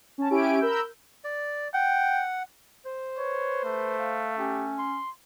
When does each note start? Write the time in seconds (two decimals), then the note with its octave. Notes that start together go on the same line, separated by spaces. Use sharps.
0.18 C#4 A5
0.31 C#4 E4 G4 G#5 D7
0.60 A#4 B5 E6 G6
1.24 D5
1.73 F#5 G5
2.86 C5
3.18 B4 C#5
3.64 A3
3.99 F5
4.38 C#4 G4
4.78 C6